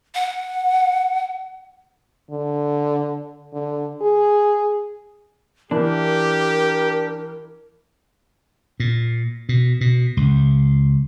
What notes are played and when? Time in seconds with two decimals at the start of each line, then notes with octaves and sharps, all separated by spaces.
0.15 F#5
2.31 D3
3.53 D3
4.01 G#4
5.71 E3 D4 G4 A#4
8.80 A#2
9.49 B2
9.81 B2
10.17 C#2